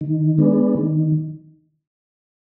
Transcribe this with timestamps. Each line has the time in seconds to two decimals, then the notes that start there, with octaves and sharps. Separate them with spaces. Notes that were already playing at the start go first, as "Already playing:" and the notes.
0.01 D#3
0.38 G#3 B3 D4
0.75 D#3